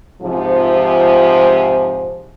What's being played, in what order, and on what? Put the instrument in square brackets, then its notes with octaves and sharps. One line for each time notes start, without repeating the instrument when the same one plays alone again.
[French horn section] G#2 C3 F3